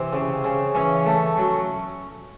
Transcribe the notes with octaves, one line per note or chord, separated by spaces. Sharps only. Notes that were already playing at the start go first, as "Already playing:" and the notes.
Already playing: C3 E3
C#3
C#3
E3 C#4
A3
F#3